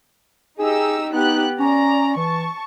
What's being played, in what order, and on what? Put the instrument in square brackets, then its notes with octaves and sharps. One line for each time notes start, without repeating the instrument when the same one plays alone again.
[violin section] D#4 G4 E6 [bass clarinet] G#4
[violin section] B3 G4 F#6 [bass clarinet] D#4
[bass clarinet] C#4 [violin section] D5 A#5
[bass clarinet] E3 [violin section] A5 C#6